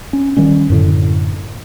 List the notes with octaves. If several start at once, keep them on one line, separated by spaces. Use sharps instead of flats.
C#4
D#3 G3 C#4
F#2 A2 D3